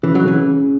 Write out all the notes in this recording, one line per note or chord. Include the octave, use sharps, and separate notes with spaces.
C#3 E3
F#3
C#3 E3